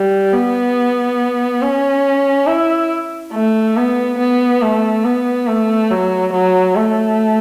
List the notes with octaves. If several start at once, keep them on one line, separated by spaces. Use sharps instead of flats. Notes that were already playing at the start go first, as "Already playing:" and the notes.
Already playing: G3
B3
C#4
E4
A3
B3
B3
A3
B3
A3
F#3
F#3
A3